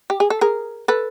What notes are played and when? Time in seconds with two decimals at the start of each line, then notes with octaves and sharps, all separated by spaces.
0.10 G4
0.20 G#4
0.30 A4
0.41 G#4 A#4
0.88 A4 B4